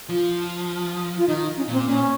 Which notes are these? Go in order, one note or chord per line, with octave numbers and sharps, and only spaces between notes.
F3 F4
F4
D#3 D#4
C#4
A#2 C4
A#2 C#4